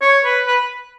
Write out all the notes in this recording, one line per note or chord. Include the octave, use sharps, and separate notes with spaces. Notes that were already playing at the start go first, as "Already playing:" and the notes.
C#5
B4
B4